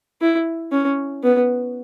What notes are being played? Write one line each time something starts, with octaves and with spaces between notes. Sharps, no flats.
E4
C#4
B3